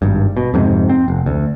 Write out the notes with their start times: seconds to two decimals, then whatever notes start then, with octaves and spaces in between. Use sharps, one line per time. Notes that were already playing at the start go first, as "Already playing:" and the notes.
0.02 G#1 G2
0.37 B2
0.54 F2 G#2 C3
0.89 C4
1.08 F1
1.26 D2